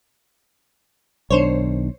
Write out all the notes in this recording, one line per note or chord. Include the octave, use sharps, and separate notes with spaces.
B1 D#3 D4 C5 C#5